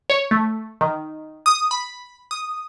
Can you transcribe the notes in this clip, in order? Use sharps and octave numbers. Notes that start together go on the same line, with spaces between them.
C#5
A3
D#3
D#6
B5
D#6